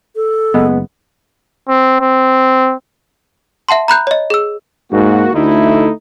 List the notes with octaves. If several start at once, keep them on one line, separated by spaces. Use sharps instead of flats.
A4
F#1 G#3 B3
C4
C4
E5 F#5 A5 C6
A#5 B5 F#6 G6
C#5 D#5
G#4 E6
G#2 A#3 F#4
D2 A3 D#4 E4